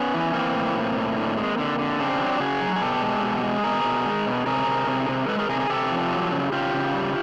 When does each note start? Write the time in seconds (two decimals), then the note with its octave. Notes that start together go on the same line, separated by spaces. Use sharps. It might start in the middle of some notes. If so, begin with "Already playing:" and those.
Already playing: B3 C#4
0.14 E3
0.33 E3 A#3 C4
0.54 A2
0.75 A2
0.96 A2
1.17 D3
1.37 G#3
1.58 D3
1.79 D3
1.99 C#3 C4 D4
2.20 F#3
2.40 C#3 F#4 G#4
2.61 F#3
2.76 G#4
2.81 B2 G4 A4
3.02 G#3
3.23 B2
3.43 G#3
3.64 B2 G#4 A#4
3.85 B2
4.06 G#3
4.27 B2
4.46 C3 G#4 A#4
4.67 C3
4.87 C3
5.09 C3
5.28 G#3 A4 B4
5.39 G#4 A#4
5.49 C3 G#4 A#4
5.60 G#4 A#4
5.70 C3 G4 A4
5.92 F3
6.11 F#3
6.32 C#3
6.52 C#3 F4 G4
6.74 C#3
6.94 G3